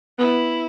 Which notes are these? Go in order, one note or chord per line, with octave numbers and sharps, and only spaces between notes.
B3 E4